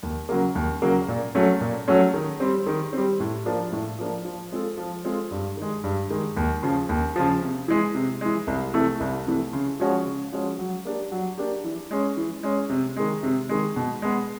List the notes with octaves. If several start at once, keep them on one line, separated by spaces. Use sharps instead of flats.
D#2
C#3 F#3 A#3
D#2
C#3 F#3 A#3
A#2
F#3 A3 C#4
A#2
F#3 A3 C#4
D#3
G3 C4
D#3
G3 C4
A2
F3 A#3 D4
A2
F3 A#3 D4
F3
G#3 C4 F4 A4
F3
G#3 C4 F4 A4
G2
D#3 G#3
G2
D#3 G#3
D#2
C#3 F3
D#2
C#3 F3
C3
E3 G#3
C3
E3 G#3
C2
C3 E3 A3
C2
C3 E3 A3
C#3
F3 G#3 C#4 F#4
C#3
F3 G#3 C#4 F#4
F#3
A#3 D4 G4
F#3
A#3 D4 G4
E3
G#3 C#4
E3
G#3 C#4
C3
D#3 G#3
C3
D#3 G#3
B2
G#3 B3